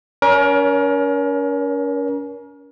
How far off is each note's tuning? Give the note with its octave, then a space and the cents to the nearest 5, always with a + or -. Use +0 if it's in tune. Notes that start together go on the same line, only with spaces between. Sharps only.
C#4 +35 A#4 +30 C#5 +0